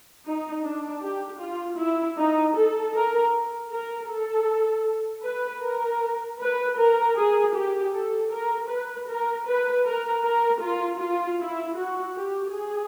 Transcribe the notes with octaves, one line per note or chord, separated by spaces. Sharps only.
D#4
D4
G4
F4
E4
D#4
A4
A#4
A#4
A4
B4
A#4
B4
A#4
G#4
G4
A4
A#4
B4
A#4
B4
A#4
A#4
F4
F4
E4
F#4
G4
G#4